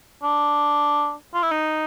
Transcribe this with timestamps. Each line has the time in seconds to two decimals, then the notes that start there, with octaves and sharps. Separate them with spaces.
0.23 D4
1.34 F4
1.43 E4
1.52 D#4